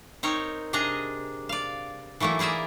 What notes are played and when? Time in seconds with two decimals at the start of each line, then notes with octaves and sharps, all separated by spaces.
0.23 C4 D#4 A#4 C#5
0.73 C3 D4 G#4 D#5 A#5
1.49 D5 F5
2.20 E3 F#3 A3 A#3 E4
2.39 E4 G#4 A#4 D5 E5